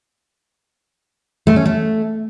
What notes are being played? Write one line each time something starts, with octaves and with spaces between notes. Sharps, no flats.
A3
C#4
A3